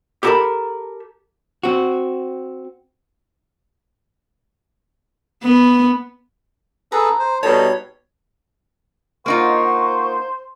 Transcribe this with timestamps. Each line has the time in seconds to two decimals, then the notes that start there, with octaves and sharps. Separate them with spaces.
0.23 G4 A4 A#4 F#5 A5 B5
1.63 C4 F#4
5.44 B3
6.92 G#4 A4 B4 A#5
7.19 C5
7.43 B2 G3 D#4 A4 C#5
9.26 A#3 D#4 F4 C5 F#5 C#6